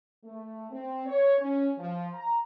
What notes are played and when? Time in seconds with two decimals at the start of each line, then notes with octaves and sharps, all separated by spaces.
0.24 A3
0.71 C4
1.06 C#5
1.39 C#4
1.77 F3
2.15 A#5